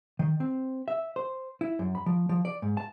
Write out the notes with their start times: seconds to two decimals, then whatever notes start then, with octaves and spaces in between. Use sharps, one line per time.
0.19 D#3
0.40 C4
0.88 E5
1.16 C5
1.61 E4
1.79 F#2
1.95 B5
2.06 F3
2.29 F3
2.45 D5
2.62 G#2
2.77 A5